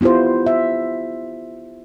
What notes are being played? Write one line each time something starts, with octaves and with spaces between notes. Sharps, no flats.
B3 E4 F4 G4 C5
E5